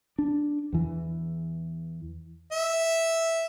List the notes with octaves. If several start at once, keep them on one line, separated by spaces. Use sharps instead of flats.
D4
E2 E3
E5